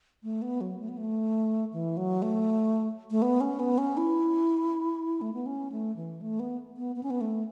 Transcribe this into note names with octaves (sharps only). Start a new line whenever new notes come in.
A3
B3
F#3
A3
B3
A3
E3
F#3
A3
A3
B3
C#4
B3
C#4
E4
A3
B3
C#4
A3
E3
A3
B3
B3
B3
C#4
B3
A3